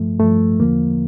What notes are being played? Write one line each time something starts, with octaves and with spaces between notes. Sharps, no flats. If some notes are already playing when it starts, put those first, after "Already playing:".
Already playing: G2 F3 A3
G2 F3 A3
E2 D3 F3 A#3